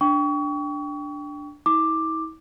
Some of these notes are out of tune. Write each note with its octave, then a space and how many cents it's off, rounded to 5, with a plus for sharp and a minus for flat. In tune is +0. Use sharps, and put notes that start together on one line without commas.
D4 +0 G5 +0 C#6 +35
E4 -45 D6 +5